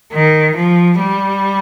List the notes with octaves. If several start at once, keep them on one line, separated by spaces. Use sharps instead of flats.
D#3
F3
G3